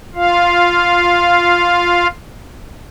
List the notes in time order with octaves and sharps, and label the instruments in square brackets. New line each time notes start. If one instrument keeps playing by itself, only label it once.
[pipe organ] F4 F5